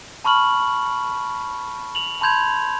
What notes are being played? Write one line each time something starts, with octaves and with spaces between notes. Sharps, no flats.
A5 B5 C#6 F6 F#7
F7 F#7
A5 B5 C6 G6 G#6 F7